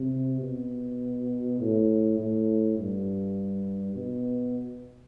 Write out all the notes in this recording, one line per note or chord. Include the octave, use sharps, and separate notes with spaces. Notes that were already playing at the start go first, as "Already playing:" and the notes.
Already playing: C3
B2
A2
A2
G2
B2